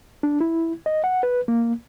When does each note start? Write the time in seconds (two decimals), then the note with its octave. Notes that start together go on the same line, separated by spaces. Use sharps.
0.23 D4
0.40 E4
0.86 D#5
1.04 F#5
1.23 B4
1.48 A#3